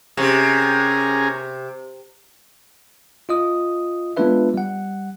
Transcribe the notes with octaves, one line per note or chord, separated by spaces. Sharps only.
C3 C#4 G#4 A#4
F4 D#5 D#6
G#3 B3 D4 F4 B4 E5
G3 F#5